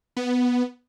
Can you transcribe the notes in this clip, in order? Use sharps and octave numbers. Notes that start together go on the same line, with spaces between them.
B3